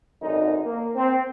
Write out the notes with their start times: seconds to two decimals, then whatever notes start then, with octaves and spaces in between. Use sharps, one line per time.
0.22 G#1 F#2 D3 D#4
0.66 A#3
0.96 C4